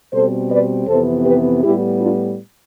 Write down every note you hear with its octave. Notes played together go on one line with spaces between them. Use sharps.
B2 G3 C4 A4 C5
B4 D5
F2 C3 E3 B3 A4 C5
G4 B4
A2 G3 B3 E4 G4
D4 F4